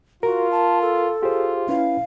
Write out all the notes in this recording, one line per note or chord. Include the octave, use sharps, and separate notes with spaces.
F4 F#4 A#4
A5
A4
F4 G4 G#4 C5
C#4 E4 B4 F5